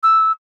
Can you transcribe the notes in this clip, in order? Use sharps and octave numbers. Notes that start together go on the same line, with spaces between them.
E6